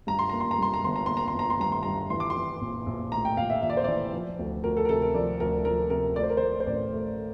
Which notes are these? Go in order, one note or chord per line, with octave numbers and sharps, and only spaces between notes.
G2 A#5
C6
A#3 A#5
C6
A#5
G2 C6
A#5
G1 C6
A#5
A#3 C6
A#5
C6
G1 A#5
C6
G2 A#5
C6
G2 A#5
E3 C6
D6
C6
E3
A#1
A#1
A2 A#5
G5
A#1 F5
E5
A#1 E5
D5
C5
E3 D5
F3
D2
D2 A#4
A4
A#4
C3 A4
A#4
F3 D5
D2 A#4
F3 A#4
C3 A#4
A3 D5
C5
A#4
C5
A3
C5
A1 D5
A3
A3